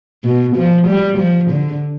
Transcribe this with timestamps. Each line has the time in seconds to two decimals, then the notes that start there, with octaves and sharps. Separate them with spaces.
0.24 B2
0.57 F3
0.88 G3
1.19 F3
1.51 D3